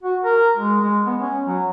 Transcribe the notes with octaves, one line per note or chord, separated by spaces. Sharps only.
F#4
A#4
G#3
G#3
B3
C#4
F#3